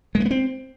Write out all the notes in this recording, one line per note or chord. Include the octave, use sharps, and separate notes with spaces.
G#3
A3
B3
C4